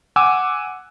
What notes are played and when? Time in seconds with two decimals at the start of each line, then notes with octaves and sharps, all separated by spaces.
0.16 F#5 G#5 D6 E6